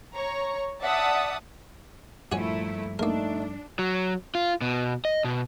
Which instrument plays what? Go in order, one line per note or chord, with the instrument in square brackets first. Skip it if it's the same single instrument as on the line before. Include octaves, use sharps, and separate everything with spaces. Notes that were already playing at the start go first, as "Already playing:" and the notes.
[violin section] C#5 A#5 C#6
D5 E5 F#5 A5 D#6
[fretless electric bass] G2 F3 [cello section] A#2 A3 E4 [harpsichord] F#4 C#5 G#5
[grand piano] A3 D#4 [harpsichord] A#3 A#4 [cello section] D4
[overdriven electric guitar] F#3
F4
B2
D#5
B2